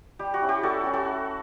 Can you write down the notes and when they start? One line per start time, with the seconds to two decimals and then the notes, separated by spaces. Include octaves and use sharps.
0.19 G3 G4
0.34 F#4
0.42 C#4 E4
0.49 G4
0.63 G3 F#4 A4
0.84 C#4 E4 G4
0.93 F#4 A4
1.08 A3